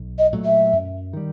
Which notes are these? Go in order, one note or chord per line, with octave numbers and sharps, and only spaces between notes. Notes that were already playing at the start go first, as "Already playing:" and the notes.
Already playing: B1
D#5
A#2 F#3 A3
E5
F#2
D#3 G3